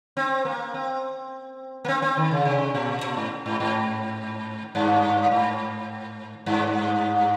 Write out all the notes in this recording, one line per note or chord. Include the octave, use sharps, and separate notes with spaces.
C4
A#3
C4
A#3
C4
C4
D#3
C#3
C3
A#2
A#2
G#2
G#2
G#2
G2
G#2
G2